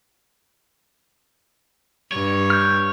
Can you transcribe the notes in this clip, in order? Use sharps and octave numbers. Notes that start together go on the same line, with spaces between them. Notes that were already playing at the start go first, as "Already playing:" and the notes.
G2 C#5
F6 G6